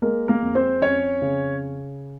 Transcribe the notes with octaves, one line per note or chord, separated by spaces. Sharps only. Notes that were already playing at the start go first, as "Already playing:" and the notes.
G#3 A#3 A#4
A#3 A#4
F2
C4 C5
F2 C#4 C#5
C#3